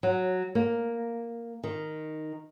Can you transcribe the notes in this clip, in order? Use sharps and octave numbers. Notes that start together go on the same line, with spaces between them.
F#3
A#3
D#3